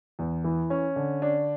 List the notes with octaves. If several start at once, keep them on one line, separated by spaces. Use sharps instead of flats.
E2
E3
C#4
D3
D4